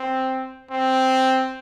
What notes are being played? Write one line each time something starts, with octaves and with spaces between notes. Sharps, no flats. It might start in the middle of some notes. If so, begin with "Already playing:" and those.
Already playing: C4
C4